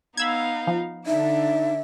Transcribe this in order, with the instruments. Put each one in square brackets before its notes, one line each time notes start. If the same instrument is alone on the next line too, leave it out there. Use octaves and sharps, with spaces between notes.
[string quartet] B3 D#4 F5 [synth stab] B5 E6 G#6
[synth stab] F3
[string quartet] D3 D4 [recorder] D#4 [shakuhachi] E5